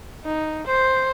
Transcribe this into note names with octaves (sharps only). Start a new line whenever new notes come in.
D#4
C5